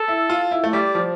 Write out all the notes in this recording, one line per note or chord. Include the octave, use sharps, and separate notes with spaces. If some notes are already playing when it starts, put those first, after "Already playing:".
Already playing: A4
E4
F4
E4
A3
G3 D5
F3